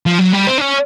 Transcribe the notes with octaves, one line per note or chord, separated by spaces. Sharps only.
F3
F#3
G3
C4
D4
C#4